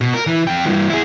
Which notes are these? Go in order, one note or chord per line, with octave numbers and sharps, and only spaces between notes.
B2
A#4
E3
F2 G5
G2 E3
E4 G#4